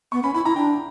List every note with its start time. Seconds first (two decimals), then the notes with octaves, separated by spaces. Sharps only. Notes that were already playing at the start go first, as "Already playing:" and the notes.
0.12 B3 C#6
0.23 C#4 B5
0.34 E4 B5
0.45 E4 A#5
0.56 D4 G5